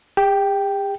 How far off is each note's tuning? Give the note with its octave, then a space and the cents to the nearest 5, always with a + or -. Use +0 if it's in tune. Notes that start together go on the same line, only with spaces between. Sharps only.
G4 +45 G5 +0